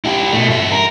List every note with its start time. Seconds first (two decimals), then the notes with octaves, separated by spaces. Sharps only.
0.05 E4 G4
0.33 B2 A3
0.49 G2 E5
0.72 A#4